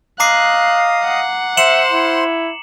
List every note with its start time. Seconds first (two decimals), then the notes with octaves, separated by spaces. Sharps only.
0.20 D#5 F5 A#5 D6 D#6 F#6 C7
1.04 F#5
1.57 C5 E5 C6 C#7 E7 F#7
1.92 E4